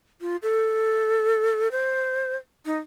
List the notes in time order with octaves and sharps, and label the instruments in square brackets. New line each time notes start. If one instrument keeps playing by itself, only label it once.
[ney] F4
A4
C5
D#4